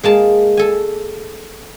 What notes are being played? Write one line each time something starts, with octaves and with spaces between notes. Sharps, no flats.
G#3 A#3 A5
A4 G#5